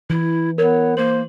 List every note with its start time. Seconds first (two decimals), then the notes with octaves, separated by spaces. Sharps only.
0.10 E3 E4
0.58 B3 A#4 C#5
0.97 A#3 C5 F#7